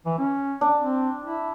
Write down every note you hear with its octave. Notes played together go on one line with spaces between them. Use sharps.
E3
C#4
D4
C4
E4